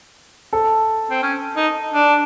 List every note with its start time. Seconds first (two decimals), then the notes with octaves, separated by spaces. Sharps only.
0.53 A4
1.11 C4
1.22 C#4
1.56 D#4
1.92 D4